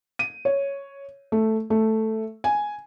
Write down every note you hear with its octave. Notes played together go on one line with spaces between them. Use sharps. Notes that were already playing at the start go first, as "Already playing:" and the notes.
D#7
C#5
A3
A3
G#5